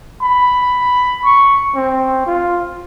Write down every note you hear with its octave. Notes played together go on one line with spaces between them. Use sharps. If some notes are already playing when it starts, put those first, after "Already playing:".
B5
C#6
C4
F4